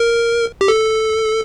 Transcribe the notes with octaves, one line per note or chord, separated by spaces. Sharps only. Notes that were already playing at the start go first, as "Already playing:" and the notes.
Already playing: A#4
G4
A4